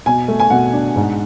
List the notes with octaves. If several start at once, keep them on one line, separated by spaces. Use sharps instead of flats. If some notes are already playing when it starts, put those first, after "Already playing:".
B2 G#5
A3
G#5
B2 F#5
D4
G#2